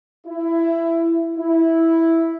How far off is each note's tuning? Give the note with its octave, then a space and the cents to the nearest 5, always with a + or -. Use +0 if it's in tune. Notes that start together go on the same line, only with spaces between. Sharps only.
E4 +15
E4 -5